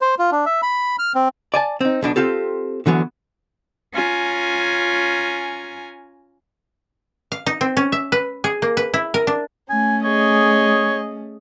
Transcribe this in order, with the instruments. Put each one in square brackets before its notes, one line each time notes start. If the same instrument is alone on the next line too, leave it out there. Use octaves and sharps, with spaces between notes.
[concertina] C5
F4
D4
E5
B5
F6
C4
[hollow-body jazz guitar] D5 G#5 A5
C4 D#4
B1 B2 D4
C4 F4 G4 A4
D3 E3 F#3 B3
[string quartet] C#4 F4 G#5 A#5
[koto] F5
D#4
C4
C#4
E5
B4
G#4
A#3
B4
E4
A#4
D4
[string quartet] A3 C#4 [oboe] G#5
[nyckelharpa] G#4 D#5 [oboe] C#5